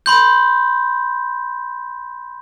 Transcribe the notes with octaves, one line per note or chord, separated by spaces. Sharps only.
B5 C6 G6